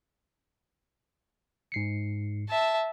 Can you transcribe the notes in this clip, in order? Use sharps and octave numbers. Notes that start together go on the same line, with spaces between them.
G#2 C7 C#7
E5 A5